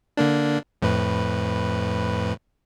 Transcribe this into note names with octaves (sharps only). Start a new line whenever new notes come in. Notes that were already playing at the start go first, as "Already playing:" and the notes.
D3 A#3 D4
F2 A2 B4